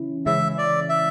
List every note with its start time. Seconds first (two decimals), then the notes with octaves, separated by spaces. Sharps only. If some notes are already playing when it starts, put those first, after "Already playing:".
Already playing: C#3 E3 C#4 E4
0.26 C#3 E3 G#3 C#4 E4 E5
0.58 D5
0.89 E5